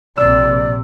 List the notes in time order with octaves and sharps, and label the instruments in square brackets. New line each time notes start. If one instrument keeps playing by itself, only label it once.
[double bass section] A#1 C3 [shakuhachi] D5 [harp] E6